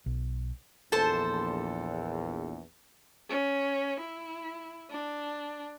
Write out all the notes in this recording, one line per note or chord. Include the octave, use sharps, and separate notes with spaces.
B1
A#1 E2 A4 C5 A5
C#4
E4
D4